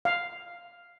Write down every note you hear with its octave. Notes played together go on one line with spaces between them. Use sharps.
F5